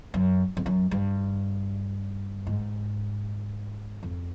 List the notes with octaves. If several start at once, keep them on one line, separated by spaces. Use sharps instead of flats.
F#2
F2
F#2
G2
G#2
F2